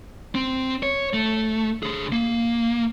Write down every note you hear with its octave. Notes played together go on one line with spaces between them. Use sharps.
C4
C#5
A3
D3 G#4
A#3